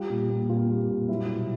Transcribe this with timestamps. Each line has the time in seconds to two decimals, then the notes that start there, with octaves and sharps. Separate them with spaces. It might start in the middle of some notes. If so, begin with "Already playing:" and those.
Already playing: G3 F4
0.10 A#2
0.30 A#2
0.49 A#3 F4
0.69 G3
0.89 A#2
1.09 F#3 E4
1.28 B2